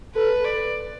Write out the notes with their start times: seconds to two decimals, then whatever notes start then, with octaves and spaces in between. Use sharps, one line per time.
0.14 A4 B4
0.44 D5